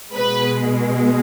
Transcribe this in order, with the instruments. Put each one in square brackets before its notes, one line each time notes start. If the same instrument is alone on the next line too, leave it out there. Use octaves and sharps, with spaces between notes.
[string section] B2 G#3 B4